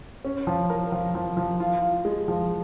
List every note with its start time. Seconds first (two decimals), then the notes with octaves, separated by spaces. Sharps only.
0.25 C#4
0.47 F3
0.70 A#4
0.92 F3
1.15 F3
1.37 F3
1.60 F4
1.82 F4
2.05 G#3
2.28 F3